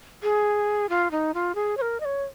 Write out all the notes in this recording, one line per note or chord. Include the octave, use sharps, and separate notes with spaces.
G#4
F4
D#4
F4
G#4
C#5
A#4
D#5
C#5